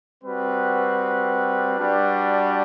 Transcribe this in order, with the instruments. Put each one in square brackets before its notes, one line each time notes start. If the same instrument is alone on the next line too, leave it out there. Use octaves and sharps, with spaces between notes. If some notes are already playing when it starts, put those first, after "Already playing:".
[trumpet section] G3 C4 F#4 B4
G3 D4 F#4